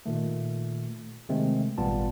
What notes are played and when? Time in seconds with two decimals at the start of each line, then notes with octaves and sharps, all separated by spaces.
0.06 A#2 D#3 A3
1.29 C3 D#3 G#3 A3 C4
1.78 G#1 A#2 G3 B3 F4 A5